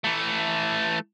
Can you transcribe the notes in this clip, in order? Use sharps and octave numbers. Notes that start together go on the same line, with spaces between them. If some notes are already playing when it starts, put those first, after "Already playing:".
E3 A3